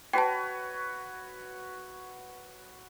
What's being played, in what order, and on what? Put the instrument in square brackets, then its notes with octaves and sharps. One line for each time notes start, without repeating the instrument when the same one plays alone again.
[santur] F#4 B4 C#5 [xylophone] G5 A5